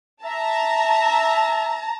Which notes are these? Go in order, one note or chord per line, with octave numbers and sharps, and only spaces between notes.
E5 A5 A#5